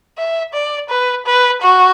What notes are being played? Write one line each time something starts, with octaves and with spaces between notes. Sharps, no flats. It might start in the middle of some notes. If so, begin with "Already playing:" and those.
E5
D5
B4
B4
F#4